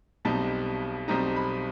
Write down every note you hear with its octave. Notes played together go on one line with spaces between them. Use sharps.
B1 B2 G3 C4 D#4 A5
B1 B2 G3 C4 D#4 A#5
B5